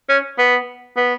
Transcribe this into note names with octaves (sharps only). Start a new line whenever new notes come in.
C#4
B3
B3